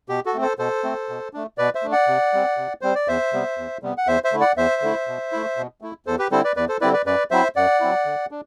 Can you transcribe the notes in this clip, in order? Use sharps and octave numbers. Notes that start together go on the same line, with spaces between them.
B2 G4
F#4 A4
A3 C4
A4 C5
B2 A4 C5
A3 C4
B2
A3 D4
B2 B4 D5
C5 E5
A3 D4
D5 F#5
C3
G3 C4
C3
G3 C4 C5
D5
E2 C5 E5
C3 G3 B3
E2
C3 G3 B3
F#5
E2 C5 E5
C5 E5
D3 A3 E4
D5 F#5
E2 C5 E5
D3 A3 E4
B2
A3 E4
B2
A3 E4
E2 A4 C5
G4 B4
D3 G3 C4 E4 A4 C5
B4 D5
E2 B4 D5
A4 C5
D3 G3 C4 E4 B4 D5
B4 D5
F#2 B4 D5
F#3 C4 E4 C5 E5
F#2 D5 F#5
F#3 C4 E4
D3
D4